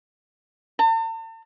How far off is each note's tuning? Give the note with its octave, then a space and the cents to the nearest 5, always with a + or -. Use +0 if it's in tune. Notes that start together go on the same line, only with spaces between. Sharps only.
A5 +45